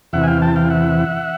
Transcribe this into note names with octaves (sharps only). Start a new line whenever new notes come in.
E2 C3 E3 E5 F#5
G#5
F5 G5
G5 A5
F5 G5
E5 F#5